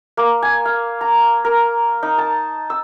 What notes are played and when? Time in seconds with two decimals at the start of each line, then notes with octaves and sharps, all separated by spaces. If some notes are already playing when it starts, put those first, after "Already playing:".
0.17 A#3
0.42 G#5
0.65 F5
1.01 A#5
1.45 A#4
2.03 D#4
2.18 A5
2.70 E6